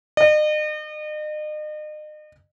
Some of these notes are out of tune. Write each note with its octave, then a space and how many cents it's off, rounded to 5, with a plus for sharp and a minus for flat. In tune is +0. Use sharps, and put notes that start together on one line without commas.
D#5 -40